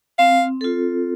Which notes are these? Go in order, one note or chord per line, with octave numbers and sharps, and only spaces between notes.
C4 F5
F4 A4